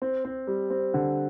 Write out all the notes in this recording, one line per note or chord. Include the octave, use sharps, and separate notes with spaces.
C4
C4
G3
C4
D3